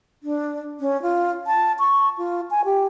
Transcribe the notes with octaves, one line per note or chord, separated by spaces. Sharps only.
D4
C#4
F4
A5
C#6
F4
G#5
G4